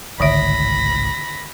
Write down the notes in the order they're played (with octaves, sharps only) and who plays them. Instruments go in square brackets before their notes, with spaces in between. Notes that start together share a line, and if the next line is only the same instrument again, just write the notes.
[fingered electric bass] G#1 C#2 A2 [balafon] D3 D#3 E5 [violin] B5 A#6